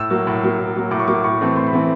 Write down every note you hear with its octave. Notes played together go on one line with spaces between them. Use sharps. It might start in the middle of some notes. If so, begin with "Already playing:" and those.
Already playing: A2 E6
F#3 A#3
A2
F#3 A#3
A2
F#3 A#3
A2 D6
C#6
F#3 A#3 D6
A2 C#6
E3 A3 C4
A2 C6
B5
E3 A3 C4